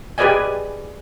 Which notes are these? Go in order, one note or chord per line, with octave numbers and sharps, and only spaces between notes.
G4 G#4 B4 D5 D#5 G#5